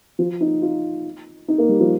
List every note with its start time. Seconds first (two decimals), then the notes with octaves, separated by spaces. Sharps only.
0.19 F3
0.41 D#4
0.62 F4
1.48 D#4
1.58 A#3
1.69 G3
1.80 F3